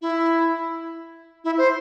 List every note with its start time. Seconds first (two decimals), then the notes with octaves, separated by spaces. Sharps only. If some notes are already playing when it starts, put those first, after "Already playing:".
0.02 E4
1.44 E4
1.58 C5